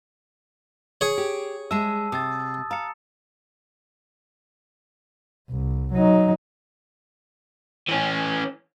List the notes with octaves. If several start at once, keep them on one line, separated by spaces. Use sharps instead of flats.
G#4 C#5
G4
G#3 E5 A5 E6
C3 D#6 E6 A6
F5 A#5 C#7
C2
F#3 D#4
E3 C#4